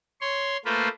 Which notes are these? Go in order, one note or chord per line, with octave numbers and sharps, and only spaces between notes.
C#5 C6
A3 A#3 F4 B4 C5